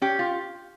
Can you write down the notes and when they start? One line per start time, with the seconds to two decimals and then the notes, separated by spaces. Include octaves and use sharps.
0.02 C#4 G4
0.19 F4